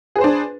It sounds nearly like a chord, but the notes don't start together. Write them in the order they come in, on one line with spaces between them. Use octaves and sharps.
G#4 B4 C5 D4